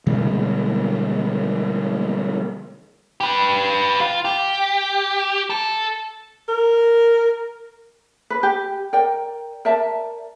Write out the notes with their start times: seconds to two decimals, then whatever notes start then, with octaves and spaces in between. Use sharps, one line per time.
0.06 B2 D3 G3 G#3
3.20 G4 B4
4.01 F4
4.25 G4
5.50 A4
6.49 A#4
8.30 B4
8.43 G4
8.93 A#4 D5 G5
9.65 A#4 D5 E5 A5